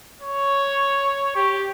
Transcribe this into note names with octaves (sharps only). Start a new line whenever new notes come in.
C#5
G4